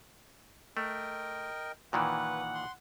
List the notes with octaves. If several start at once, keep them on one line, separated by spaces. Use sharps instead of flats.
A3 A#4 D#5 G5
A#2 D#3 E3 B4 F#5
C6